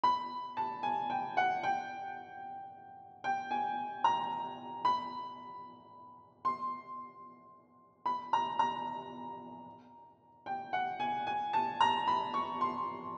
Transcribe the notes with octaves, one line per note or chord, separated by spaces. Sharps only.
B5
A5
G#5
G5
F#5
G5
G5
G#5
A#5
B5
C6
B5
A#5
A#5
G5
F#5
G#5
G#5
A5
A#5
B5
C#6
C6